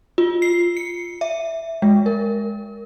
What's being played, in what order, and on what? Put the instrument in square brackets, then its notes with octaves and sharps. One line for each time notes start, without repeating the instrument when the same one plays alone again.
[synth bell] F4
C7
C#7
E5
G#3
A#4